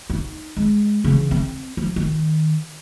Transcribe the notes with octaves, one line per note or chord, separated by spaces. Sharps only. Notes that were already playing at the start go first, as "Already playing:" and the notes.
D#4
G#3
C#3 E3
C4
F3
D#3